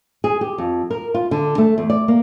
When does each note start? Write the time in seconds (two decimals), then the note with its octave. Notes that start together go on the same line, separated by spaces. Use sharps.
0.24 G#4
0.41 G4
0.58 F2
0.91 A#4
1.14 F4
1.31 D3
1.58 A3
1.78 E2
1.90 D5
2.08 A#3